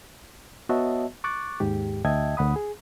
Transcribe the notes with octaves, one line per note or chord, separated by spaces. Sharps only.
B3 F#4 C#5 D#5 E5 A5
C#6 D6 F#6 A6
D#2 G#2 G4
D2 D#5 E5 G5 A5 G#6
D2 F#5 B5 D#6
G#4